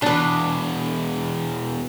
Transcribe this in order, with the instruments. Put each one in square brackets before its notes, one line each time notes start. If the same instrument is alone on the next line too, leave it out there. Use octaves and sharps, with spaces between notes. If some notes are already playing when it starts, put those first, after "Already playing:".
[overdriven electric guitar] E2 B2 [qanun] D4 B4